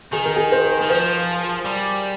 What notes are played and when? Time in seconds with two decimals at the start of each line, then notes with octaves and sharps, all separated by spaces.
0.13 D#3 G#4
0.25 A#4
0.36 G#4
0.52 C5
0.82 D#3
0.89 F3 C5
1.65 G3